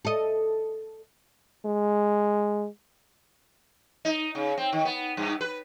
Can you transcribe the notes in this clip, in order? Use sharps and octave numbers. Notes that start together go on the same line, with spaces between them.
A4 D#5
G#3
D#4
C#3
C4
D#3
B3
G2
B4